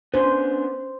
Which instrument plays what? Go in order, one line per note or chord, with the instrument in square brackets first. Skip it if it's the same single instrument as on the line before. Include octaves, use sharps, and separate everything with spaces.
[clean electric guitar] B3 C#4 D4 [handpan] C5